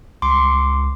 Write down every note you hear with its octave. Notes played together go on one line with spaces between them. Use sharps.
C#2 C6 D6